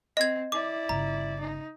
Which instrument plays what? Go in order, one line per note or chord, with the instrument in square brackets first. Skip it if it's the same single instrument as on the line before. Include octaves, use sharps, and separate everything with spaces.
[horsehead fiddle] C4 [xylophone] D#5 G#6
[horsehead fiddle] E4 D5 [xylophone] D6
[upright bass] G1 C#3 [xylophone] A#5
[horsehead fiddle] D#4